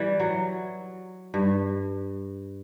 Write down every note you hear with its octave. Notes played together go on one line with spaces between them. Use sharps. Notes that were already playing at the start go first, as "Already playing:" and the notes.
Already playing: E3 G3
F#3
G2